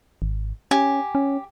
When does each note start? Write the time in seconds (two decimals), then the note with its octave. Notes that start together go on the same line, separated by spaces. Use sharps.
0.22 G#1
0.71 C#4 G4 G#5
1.15 C#4